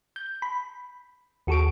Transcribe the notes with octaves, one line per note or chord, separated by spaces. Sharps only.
G6
B5
D#2 F#4 G#4 A4 C#6 D7